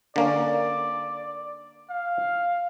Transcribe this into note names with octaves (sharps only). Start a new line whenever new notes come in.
D3 A#3 C#4 D5
F5